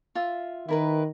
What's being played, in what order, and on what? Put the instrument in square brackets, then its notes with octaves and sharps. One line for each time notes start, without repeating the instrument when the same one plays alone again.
[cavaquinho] F4 E5
[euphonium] D#3 [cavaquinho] E4 A#4 B4